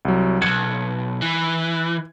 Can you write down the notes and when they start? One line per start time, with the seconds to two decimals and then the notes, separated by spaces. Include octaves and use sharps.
0.05 C2 F#3
0.42 B1 F2 G#6 C#7
1.22 E3